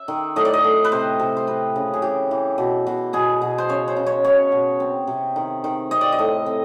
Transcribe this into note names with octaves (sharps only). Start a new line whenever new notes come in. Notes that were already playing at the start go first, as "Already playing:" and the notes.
Already playing: E5
D#3
A2 D#5
D5
D#5
A2
B4
C3 C5
C3
C5
C4 B4
C#3
G#4
E3 G4
E3
B2
B2
B2 G#4
B2
C5
C#3 C#5
C5
C#3
C#5
B2 C#5
B2
C4
C3
D#3
D#3
C4 D#5
D5
D#5
A2
C4